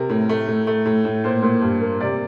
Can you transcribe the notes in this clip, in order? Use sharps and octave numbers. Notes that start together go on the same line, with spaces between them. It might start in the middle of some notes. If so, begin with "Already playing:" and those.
Already playing: C3 A#4
A2
A3
A2
A3
A2
A2
A#2 C5
A#2
G2
A#3
C3 D5